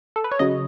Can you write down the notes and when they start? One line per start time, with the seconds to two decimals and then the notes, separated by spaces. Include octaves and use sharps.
0.16 A4
0.24 B4
0.32 C#5
0.39 C#3 F#3 D#5